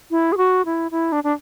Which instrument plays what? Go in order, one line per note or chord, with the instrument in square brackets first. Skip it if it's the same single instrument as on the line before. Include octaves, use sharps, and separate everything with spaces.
[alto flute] E4
G#4
F#4
E4
E4
D4
D4